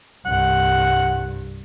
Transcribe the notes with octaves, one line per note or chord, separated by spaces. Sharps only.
C2 G2 F#5